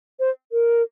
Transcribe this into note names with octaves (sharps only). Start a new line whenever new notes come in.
C5
A#4